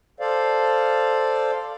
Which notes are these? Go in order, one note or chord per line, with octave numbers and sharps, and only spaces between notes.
A4 C5 D5 F5